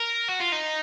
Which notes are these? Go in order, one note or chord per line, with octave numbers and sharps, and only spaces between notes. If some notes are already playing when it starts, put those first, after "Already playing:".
Already playing: A#4
F#4
F4
D#4